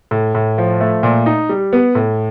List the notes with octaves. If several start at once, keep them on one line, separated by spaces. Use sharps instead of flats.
A2
A2
F3
A3
A#2
D#4
G3
B3
A2